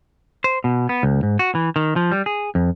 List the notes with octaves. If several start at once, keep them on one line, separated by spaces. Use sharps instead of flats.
C5
B2
B3
C#2
G#2
F#4
E3
D#3
F3
G3
G#4
F2